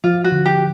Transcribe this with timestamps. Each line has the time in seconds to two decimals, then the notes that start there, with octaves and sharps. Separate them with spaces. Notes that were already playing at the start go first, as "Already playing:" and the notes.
0.04 F3 F4
0.24 F#4
0.32 D3
0.46 G4